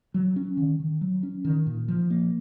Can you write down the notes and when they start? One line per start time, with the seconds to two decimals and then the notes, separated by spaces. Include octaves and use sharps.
0.14 F#3
0.36 C#4
0.57 D#3
0.80 D#3
1.01 F#3
1.23 C#4
1.45 D#3
1.66 A#2
1.88 F3
2.10 A#3